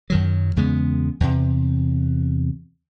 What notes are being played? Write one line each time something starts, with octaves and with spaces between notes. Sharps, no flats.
F#2 D#3 F#3
E2 C#3 G#3 B3
E2 C3